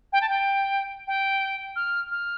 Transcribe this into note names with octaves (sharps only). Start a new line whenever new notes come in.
G5
A5
G5
G5
F6
F6